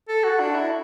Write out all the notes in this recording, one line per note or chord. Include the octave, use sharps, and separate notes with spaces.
A4
F#4
D4
E4